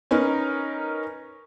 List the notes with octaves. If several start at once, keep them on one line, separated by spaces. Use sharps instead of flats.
C#4 D#4 A#4 B4